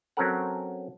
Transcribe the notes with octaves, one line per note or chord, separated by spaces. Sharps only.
F#3 C4 C#4 A4 A#4 F#5